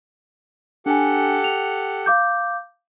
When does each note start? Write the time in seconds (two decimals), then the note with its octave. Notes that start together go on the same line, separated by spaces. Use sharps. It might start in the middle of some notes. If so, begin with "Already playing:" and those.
0.86 D4 G4 A4 F#5 G#5
1.44 F7
2.06 F5 D6 G6